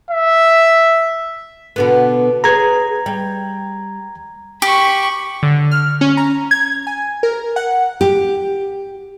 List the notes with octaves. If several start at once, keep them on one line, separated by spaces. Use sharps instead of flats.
E5
B2 D3 B3
G#4 B4 C#5 A#5 G#6
G3
G4 B5 C#6
D3
F6
C#4
A#5
G#6
G#5
A#4
F#5
G4